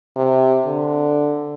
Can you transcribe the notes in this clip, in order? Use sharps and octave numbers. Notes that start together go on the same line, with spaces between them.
C3
D3